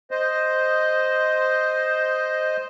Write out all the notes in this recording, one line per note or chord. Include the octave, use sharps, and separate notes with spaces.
C5 D#5